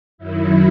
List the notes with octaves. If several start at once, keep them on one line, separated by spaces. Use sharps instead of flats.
F#2 D#3 F#3 E4